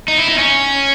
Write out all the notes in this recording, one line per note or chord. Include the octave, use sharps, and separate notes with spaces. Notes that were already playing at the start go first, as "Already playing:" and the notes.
D#4
E4
D#4
C#4